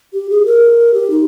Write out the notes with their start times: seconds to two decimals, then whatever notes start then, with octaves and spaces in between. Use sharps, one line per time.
0.13 G4
0.30 G#4
0.46 A#4
0.94 G4
1.10 D#4